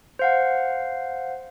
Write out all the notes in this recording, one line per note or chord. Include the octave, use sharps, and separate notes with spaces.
C5 F5 F#5